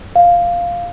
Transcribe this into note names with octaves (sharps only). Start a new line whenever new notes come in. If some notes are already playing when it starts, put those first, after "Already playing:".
F5